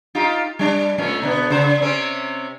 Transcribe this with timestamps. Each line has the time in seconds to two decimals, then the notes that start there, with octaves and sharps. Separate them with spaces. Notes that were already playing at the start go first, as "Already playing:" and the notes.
0.15 D#4 F4 G4
0.59 G3 D4
0.98 A#2 A3 C#4
1.22 B2 D3 B3
1.50 C#3 C5
1.82 C3 C4 C#4